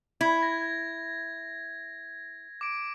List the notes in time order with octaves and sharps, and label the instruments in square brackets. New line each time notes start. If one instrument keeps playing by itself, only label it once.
[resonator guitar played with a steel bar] E4 [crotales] G#6
[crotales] A#6
D6 D7